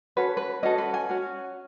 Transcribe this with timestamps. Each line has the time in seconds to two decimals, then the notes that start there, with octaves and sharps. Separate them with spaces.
0.17 C#4 F#4 A4 B4
0.37 B4
0.63 C#4 F#4 A4 D#5
0.78 B4
0.94 G#5
1.10 C#4 F#4